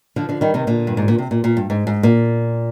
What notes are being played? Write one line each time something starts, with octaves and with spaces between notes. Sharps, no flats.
D3 F3
D3 F3
D#3 G3
C3 D#3
A#2 D3
G2
G#2
A#2
C3
A#2
A#2
G2
G#2
G#2
A#2